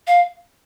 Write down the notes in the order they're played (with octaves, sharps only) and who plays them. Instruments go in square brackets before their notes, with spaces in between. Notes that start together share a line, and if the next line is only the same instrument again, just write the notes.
[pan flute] F5